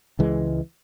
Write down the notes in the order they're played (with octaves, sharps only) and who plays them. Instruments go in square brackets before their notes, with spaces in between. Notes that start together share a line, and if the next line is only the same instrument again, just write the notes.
[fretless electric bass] C#2 E3 G#3